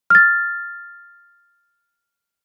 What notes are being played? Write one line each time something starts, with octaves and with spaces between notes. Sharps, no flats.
F6 A6